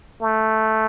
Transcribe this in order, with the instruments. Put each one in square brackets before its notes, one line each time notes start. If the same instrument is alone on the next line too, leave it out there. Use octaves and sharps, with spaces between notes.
[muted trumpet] A3